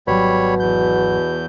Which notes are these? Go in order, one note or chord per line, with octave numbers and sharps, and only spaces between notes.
G#1 B2 F#3 G3 C#5 B5
E2 G6